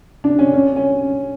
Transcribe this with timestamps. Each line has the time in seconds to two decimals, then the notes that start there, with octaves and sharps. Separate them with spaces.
0.24 D4
0.39 C#4
0.53 C#4
0.76 C#4